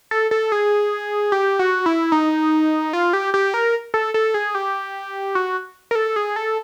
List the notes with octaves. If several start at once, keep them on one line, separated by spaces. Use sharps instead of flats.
A4
A4
G#4
G4
F#4
E4
D#4
F4
G4
G4
A#4
A4
A4
G#4
G4
F#4
A#4
A4
G#4
A4